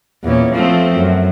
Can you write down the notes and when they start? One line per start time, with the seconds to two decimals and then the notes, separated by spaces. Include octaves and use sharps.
0.24 E2 A#2 C#4
0.54 F3 A3 C4
0.96 F#2